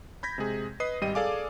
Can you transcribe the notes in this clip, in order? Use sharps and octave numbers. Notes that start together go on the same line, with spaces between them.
B5 G6 G#6 A#6 B6
C3 G#3 G#4
B4 D#5 D#6 C7
G#1 G3 G4 D#5 D#7
G#4 A4 D5 F5 G#5 D6